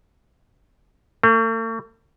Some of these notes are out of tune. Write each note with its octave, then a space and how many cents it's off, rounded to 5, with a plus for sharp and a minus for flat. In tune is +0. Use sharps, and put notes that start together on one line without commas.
A3 +45